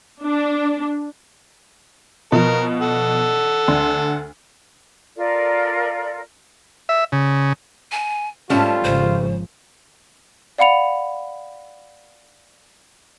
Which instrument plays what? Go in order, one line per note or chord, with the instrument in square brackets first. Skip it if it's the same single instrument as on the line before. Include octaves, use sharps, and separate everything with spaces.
[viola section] D4
[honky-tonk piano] B2 F3 [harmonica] A#4
[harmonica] A4 F#5
[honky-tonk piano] D2 D4 C6
[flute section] F4 A4 A#4 D5
[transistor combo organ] E5
C#3
[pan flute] G#5
[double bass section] G#2 C4 [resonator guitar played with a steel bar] G3 A3 C#4 [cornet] F4 [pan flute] A5
[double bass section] G#1 C#3 F3 [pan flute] C5
[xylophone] D5 F5 F#5 B5 C#7 F7